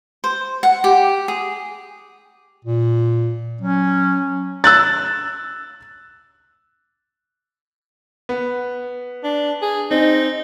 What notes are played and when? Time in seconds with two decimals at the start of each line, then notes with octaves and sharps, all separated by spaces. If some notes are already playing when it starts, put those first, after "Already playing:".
0.24 C5
0.63 F#5
0.84 G4
1.28 G#4
2.65 A#2
3.61 F#3 C#4
4.64 E6 F#6 A6
8.29 B3
9.24 D4
9.62 G#4
9.91 C4 D#4